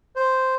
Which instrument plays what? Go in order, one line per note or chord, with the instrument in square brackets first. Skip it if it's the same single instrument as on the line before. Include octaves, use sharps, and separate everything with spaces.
[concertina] C5